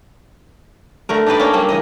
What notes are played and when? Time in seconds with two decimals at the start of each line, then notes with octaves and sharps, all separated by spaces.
1.09 D3 A3 A#4
1.26 D4 D#4 G4 B4 D5
1.39 A#3 C#4 D4 A4 A#4
1.53 F#3 G3 A#3 D4
1.69 C#3 E3 D#5